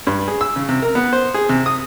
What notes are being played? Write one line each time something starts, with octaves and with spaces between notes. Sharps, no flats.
G2
G#4
E6
C#3
C3
A#4
B3
C5
G#4
C3
D#6